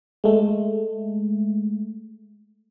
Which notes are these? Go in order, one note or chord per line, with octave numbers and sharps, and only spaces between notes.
G#3 A3